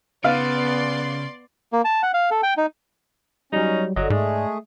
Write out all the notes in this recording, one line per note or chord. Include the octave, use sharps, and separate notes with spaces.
C#3 B3 D5 F5 C6
A#3
A5
F#5
F5
A4
G5
D#4
F#3 G3 C#4 D#4
G1 D3 F#3 D#5
G#2 G#3 A3 G#4 D5